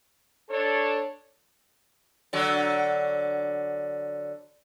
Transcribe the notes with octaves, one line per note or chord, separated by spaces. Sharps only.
D4 A4 C#5
D3 F#3